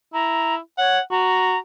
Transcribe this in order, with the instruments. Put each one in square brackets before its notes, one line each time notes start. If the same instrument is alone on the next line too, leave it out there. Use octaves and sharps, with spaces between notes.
[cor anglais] E4 [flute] A#5
[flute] C#5 [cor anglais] F#5
[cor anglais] F#4 [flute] A#5